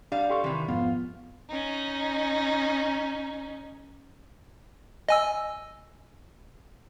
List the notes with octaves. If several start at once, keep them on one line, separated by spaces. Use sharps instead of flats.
G3 D4 F5
G4 A4 C6 C#6
C3 D#3 E3
F2 G#2 B3 F4
C#4 D#4
D#5 G#5 E6